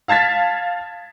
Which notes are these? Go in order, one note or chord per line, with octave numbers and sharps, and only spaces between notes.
F5 A5 G#6 A6 B6